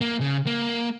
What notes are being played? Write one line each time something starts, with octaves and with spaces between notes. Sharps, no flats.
A#3
C#3
A#3